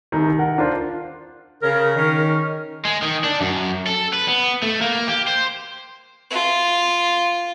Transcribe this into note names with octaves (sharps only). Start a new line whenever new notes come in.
C2 D#3
A#4 F#5
D4 F4 A#4 C5
C#3 A#4
D#3 C#4
G#3
D#3
D4
F#2
A4
B4
B3
A3
A#3
G4
C5
F4